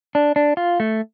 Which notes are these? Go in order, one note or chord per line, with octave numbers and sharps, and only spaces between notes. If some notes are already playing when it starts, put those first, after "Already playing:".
D4
D4
F4
A3